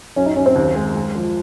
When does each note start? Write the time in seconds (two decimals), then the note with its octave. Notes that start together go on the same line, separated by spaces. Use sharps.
0.16 F#2 C#4
0.26 D#4
0.36 F#2 C#4
0.46 C4
0.56 D#2
0.75 G#3
0.95 G#3
1.15 F3